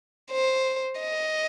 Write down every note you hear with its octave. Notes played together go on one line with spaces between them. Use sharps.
C5
D#5